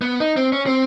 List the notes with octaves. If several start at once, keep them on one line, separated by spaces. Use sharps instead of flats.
B3
D#4
C4
C#4
C4